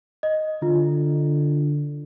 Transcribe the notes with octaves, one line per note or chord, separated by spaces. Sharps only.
D#5
D3 F4